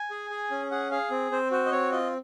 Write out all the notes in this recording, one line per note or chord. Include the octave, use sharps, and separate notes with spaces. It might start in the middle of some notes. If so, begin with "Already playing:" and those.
Already playing: G#5
G#4
G#4
C#4
G#4 F#5
G#4 F5
C4
C4 C5
F#4 C5
D#5
C4 C#5
F4 D#5